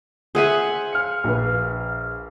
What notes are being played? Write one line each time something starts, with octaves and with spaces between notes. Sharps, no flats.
G#4 C5 E5 F#5 G#5
F5 F6 C#7
A#1 B4